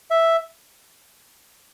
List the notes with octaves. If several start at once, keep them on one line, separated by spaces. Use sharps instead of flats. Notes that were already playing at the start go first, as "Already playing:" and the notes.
E5